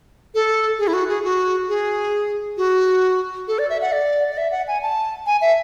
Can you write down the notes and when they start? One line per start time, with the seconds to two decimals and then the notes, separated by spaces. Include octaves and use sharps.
0.35 A4
0.79 G#4
0.87 E4
0.93 F#4
1.09 G#4
1.24 F#4
1.69 G#4
2.57 F#4
3.48 A4
3.59 D5
3.70 E5
3.82 F#5
3.92 D5
4.31 D5
4.38 E5
4.52 F#5
4.68 G#5
4.83 A5
5.26 G#5
5.41 E5